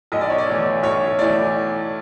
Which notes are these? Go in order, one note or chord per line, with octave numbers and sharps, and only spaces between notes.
B1 D#5
D5
C#5
D5
A2 E3
B1 C#5
A2 E3 D5